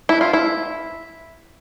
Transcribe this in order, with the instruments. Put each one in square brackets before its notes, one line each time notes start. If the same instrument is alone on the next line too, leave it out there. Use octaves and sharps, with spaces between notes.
[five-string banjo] E4
F4
E4